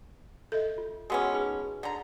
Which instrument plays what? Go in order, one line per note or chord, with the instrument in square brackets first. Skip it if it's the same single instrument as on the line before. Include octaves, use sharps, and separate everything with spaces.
[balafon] A4 [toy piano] D#5 E5
[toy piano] F4
[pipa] G#3 B3 C#4 [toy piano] F#4 G#4 A#4
[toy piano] D#4 G#4 B4
[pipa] D3 A#5 [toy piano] D5